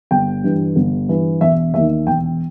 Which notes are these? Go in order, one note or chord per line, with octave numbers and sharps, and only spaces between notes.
G1 G5
G2 E3
G1
G2 E3
E1 E5
D#2 D#3 E5
E1 G5